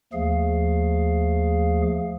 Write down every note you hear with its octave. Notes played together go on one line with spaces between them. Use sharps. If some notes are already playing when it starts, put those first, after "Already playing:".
D#2 F3 A3 G#4 F5